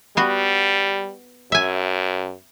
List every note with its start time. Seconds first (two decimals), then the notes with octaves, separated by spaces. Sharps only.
0.17 G3 B3 F#4
1.52 F#2 E5 G#5